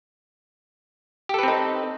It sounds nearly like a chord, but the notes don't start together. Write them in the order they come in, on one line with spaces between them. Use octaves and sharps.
G4 A4 B4 C4 D#4